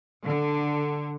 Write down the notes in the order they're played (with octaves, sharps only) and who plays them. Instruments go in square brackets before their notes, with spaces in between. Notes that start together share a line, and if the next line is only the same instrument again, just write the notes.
[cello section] D3